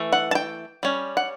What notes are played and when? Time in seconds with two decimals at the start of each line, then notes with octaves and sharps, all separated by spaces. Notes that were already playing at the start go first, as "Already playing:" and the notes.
Already playing: E3 A3
0.13 F#5
0.31 A5
0.35 G5
0.83 G3 C#4
1.17 F#5